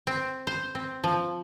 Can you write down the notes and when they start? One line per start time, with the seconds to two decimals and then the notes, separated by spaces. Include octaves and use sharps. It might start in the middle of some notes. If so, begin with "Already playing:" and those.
0.07 C4
0.47 C5
0.75 C4
1.04 F3